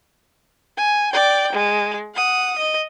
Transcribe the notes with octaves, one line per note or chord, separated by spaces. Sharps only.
G#5
D5 G5
G#3
F#5 D#6
D#5